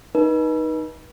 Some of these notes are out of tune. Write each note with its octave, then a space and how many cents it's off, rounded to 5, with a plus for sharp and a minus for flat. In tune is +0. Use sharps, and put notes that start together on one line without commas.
D#4 +0 B4 -35